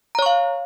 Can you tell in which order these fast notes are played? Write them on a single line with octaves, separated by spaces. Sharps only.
A#5 C#5 C#6 F5